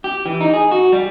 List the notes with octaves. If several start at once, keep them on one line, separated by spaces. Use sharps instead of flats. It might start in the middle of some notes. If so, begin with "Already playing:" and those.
G4
E3
D#4
G#4
F#4
G3